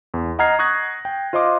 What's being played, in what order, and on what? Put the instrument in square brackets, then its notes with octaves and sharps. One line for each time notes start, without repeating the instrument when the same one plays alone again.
[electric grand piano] E2
D#5 F#5 A#5 F6 G#6 C7
C#6 D#6 F#6 G#6 A#6
G5
F4 C5 D#5 C6 D6